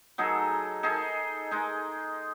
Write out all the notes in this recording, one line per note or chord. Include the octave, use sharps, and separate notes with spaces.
F#3 D#4 G#4 A4
D#4 G#4 A4
G#3 D#4